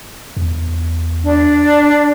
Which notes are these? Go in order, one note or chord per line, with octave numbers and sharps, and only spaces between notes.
E2
D4